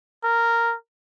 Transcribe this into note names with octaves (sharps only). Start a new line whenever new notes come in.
A#4